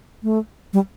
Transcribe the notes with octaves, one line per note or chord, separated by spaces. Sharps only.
A3
G3